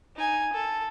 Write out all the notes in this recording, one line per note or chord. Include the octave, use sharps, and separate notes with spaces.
D#4 G#5
A4